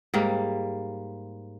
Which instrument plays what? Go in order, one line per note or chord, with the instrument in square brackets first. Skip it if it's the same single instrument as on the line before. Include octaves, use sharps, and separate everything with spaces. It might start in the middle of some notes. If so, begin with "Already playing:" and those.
[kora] G#2 G3 A#3